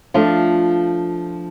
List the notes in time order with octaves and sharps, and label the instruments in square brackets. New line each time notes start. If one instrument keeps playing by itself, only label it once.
[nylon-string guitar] F3 A3 D4 F4